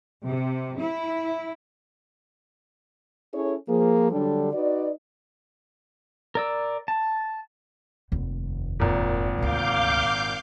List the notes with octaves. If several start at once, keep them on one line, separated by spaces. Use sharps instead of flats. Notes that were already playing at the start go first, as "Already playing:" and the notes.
C3
E4
C#4 E4 G#4 A4 C#5
F3 A#3 G#4
D3 F#3 G3 D4 G4 A4
D#4 F#4 B4 D5
A#4 D5 E6
A5
F1 D#2
G#1 A#2
D2 C3 F5 D6 G6